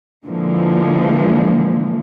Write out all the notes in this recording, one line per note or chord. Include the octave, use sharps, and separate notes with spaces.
A#2 D3 E3 F3 G#3 A#3